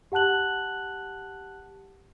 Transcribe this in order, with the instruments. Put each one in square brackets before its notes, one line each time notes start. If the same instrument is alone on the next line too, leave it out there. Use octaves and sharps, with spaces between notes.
[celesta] G4 F#5 A5 F#6 F#7